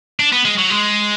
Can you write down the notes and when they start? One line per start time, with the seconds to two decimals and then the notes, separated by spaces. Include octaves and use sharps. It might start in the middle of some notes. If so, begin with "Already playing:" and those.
0.20 D4
0.32 B3
0.45 G#3
0.58 F#3
0.70 G#3